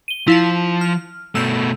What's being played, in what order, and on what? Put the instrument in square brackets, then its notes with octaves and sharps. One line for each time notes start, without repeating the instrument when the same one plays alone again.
[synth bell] D#7 G7
[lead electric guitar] F3 [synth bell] E4 F5 A5
[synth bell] F6
[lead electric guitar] B2 A3 [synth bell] E6 G6